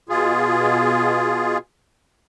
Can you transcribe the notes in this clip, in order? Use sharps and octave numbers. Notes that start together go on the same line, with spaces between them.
B2 F4 G#4